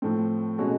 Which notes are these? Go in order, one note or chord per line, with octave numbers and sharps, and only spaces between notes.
A2 F3 A3 C4
B2 G#3 C#4 F#4 A4